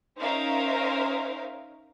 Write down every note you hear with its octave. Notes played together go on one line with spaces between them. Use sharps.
C#4 D#4 A#4 C5 E5 F5